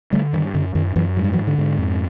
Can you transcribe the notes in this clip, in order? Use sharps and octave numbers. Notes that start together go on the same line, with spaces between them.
D3 G3 A3
G2 D#3
F#2 D3
F#2 D#3
F#2 E3 F#3
G#2 F#3
G3
E3 F#3
G#2
D3
G#2
F2